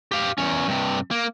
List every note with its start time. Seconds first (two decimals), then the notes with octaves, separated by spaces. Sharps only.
0.12 G4 F5
0.38 E2 C#4
0.68 G2 C3
1.11 A#3